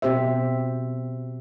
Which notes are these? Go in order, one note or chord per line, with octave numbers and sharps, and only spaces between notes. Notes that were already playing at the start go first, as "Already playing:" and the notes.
B2 C4 G4 C5 E5